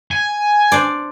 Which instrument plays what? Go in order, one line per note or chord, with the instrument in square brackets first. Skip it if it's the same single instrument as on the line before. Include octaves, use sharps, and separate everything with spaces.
[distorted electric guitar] G#5
[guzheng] D4 C5 D5